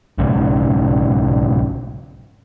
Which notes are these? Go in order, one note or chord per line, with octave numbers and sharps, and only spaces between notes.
B1 G#2 C#3